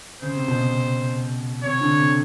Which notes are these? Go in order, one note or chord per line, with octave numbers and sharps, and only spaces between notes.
C#3 C5
C3
B2
C3
C3 C#5
D3
C3